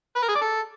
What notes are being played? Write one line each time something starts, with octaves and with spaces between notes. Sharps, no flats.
B4
A#4
G#4
D5
A4